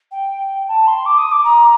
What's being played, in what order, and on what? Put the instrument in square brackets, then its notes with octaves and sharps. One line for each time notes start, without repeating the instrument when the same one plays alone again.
[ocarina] G5
A5
C6
D6
D#6
D6
A#5